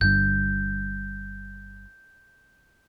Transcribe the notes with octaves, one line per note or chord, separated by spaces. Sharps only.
G1 G2 G6